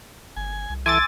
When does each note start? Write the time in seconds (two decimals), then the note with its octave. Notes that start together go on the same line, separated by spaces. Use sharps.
0.36 G1 G#5
0.69 C2
0.86 E3 E4 A4 G#5 C6 D6 E6 A6